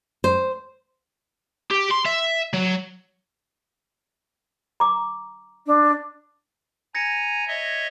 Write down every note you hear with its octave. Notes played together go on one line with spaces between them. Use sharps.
C5
G4
C6
E5
F#3
A#5 D6
D4
G#5 A#5 G#6 A#6 C#7
C#5 D#5 E5